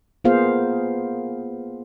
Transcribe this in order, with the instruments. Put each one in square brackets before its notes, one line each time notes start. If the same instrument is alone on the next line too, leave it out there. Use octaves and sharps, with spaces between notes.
[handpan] A#3 B3 F4 G#4 C5 F5